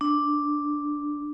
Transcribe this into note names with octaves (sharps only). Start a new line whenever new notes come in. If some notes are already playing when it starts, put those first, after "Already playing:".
D4